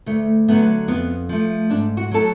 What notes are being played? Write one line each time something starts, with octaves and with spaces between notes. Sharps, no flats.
D2 A3
D3 F#3 A3 B3
F2 B3
F3 A3
G#2 D4
F#4
F#3 A3 A4